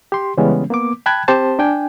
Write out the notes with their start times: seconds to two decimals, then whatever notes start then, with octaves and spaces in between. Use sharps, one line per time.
0.12 G4 C6
0.37 C#3 E3 G3 G#3 B3 C#4
0.70 A#3 B3 D6
1.06 G5 A5 B5 F#6 G#6
1.28 C4 G4 C5 A5
1.59 D4 G5 G#5